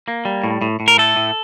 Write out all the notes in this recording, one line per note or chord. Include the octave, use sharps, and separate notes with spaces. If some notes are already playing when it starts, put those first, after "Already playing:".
A#3
G3
A2
A2
A2
A#4
A3 A4
A2